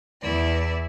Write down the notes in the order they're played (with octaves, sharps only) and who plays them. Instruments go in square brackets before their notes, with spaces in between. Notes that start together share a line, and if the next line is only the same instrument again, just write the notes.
[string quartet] E2 E4 D5